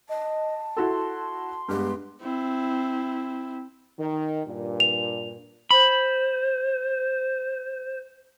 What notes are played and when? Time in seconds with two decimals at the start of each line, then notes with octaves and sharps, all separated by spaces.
0.09 D#5 A5
0.77 E4 F#4 A4 C6
1.69 G2 G#3 B3 G4
2.21 C4 E4
3.99 D#3
4.46 G2 A#2
4.80 F7
5.71 C5 B5